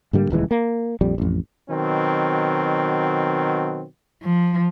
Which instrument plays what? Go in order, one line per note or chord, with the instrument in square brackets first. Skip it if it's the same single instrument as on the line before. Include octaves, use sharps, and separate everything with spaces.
[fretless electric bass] G#2 D3 G3 A#3
D#1 C#2 E3 G#3
A#3
A#1 F2 G3
A1 F2
[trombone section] B2 D#3 F#3 C4
[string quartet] F3